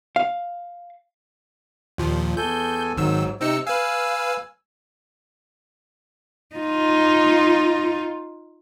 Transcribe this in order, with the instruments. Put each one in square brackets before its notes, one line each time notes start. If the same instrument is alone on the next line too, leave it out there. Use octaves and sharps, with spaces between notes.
[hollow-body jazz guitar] F5
[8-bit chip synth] D#2 A#2 F3
[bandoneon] E2 A4 G#5 [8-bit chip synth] G6
[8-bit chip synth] G#1 D#3 E6 [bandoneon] G#2 F#3
[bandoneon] C3 E6 [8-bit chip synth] C4 D#4 C#7
[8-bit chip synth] B4 F5 [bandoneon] G#5 E6
[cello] D#4 F4